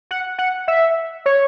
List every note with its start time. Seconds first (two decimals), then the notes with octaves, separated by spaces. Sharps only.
0.11 F#5
0.38 F#5
0.68 E5
1.26 C#5